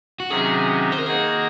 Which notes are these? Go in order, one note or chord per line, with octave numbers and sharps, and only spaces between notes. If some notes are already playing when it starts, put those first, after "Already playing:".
F#4
C3 D#3 F#3 C#4 G#4
C5
A#4
D#3 A#3 D#4 F#4 G#4